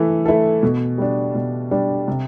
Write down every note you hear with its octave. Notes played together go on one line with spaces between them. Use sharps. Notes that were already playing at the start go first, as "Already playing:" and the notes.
Already playing: E3 A3 A4
A3 E4 A4
B2
G3 D4
B2
G3 D4
C3